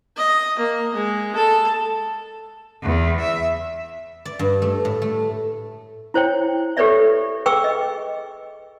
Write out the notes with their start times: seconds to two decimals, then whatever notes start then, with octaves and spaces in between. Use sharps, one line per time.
0.17 D#5
0.59 A#3
0.94 G#3
1.36 A4
2.83 E2
3.21 E5
4.25 D5
4.39 G2
4.62 A3
4.85 A2
5.02 A3
6.14 E4 C5 C#5 G5
6.77 G4 A4 B4 C#5 D5 E5
7.46 G#4 B4 G5 C#6 D6 E6
7.64 D#5